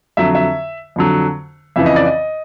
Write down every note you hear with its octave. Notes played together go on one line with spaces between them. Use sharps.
F2 D3 F#3 E5
E5
F2 D3 F#3
F2 C#3 E3 E5
D#5
D5
D#5